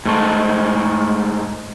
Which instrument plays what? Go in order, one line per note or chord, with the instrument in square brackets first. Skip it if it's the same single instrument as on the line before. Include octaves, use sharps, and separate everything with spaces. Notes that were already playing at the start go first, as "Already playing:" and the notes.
[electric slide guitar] G#2 A3